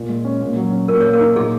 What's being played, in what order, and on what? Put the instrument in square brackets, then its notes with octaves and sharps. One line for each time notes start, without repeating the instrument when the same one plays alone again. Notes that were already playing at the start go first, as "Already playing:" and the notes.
Already playing: [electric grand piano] A#2
G#3
C#4
A#2
F#3
C#4
[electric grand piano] A#2 [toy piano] A#4
[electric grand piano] A#3 [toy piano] C#5
[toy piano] A#4
[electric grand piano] D#4
[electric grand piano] A#2 [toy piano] G#4